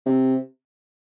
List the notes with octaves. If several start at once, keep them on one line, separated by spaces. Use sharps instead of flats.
C3